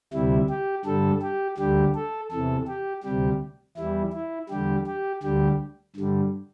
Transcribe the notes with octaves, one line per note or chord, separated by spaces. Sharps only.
D2 C3 G3 E4
G4
G2 D3 G3 A4
G4
D2 D3 G3 G4
A4
E2 C3 E3 A4
G4
D2 C3 G3 G4
E2 E3 G3 E4
E4
E2 D3 G3 G4
G4
D2 D3 G3 G4
G2 D3 G3